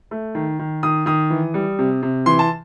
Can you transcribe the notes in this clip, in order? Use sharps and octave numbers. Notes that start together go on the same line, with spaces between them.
A3
D#3
D#3
D#3 D#6
D#3 D#6
E3
G3
C3
C3
E3 C6
A5